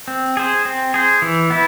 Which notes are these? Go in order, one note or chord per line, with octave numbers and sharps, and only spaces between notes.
C4
G#4 C5
C4
G#4 C5
E3
B3 E4